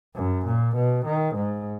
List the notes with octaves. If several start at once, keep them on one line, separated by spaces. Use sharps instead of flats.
F#2
A#2
B2
D#3
G#2